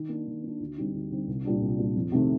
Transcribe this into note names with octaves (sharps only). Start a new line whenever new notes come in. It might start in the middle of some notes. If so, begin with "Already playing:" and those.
Already playing: D#3
A#3 D4
D#3
A#3 D4
D2
D3 G3 C4 D#4
D2
D3 G3 C4 D#4
C2
A#2 G3 D4
C2
A#2 G3 D4
F2
C3 D#3 A3 C4